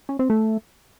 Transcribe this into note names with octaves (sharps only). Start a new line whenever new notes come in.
C#4
C4
A3